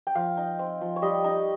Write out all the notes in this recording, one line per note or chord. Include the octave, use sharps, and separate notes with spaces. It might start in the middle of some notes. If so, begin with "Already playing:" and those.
G5
F3 F5
D#4
C4
F3
C#5
G3 D#5
D#4